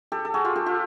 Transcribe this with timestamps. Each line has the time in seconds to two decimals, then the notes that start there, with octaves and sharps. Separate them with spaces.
0.12 G4 A4
0.25 A4
0.34 F#4 G#4
0.45 F4 G4
0.56 G4 A4
0.66 F4 G4